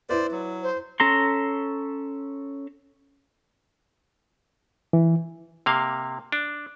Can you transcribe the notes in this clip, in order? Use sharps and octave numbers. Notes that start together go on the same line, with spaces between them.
E4 B4 C5 D5
F#3
C5
C#4 A4 A#5 C6
E3
C3 A#3 F5
D4